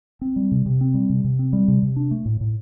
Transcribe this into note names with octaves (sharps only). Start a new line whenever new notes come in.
C4
G3
C3
C3
C4
G3
C3
C3
C4
G3
C3
C3
D4
A3
A2
A2